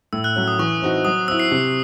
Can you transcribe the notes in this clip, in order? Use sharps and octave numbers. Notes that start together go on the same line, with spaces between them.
A2 E6
F#6
F#3 C#4
D#6
E3 C#6
C4 D#4 F#4
F#3 D#6
C4 E4 E6
C7
C3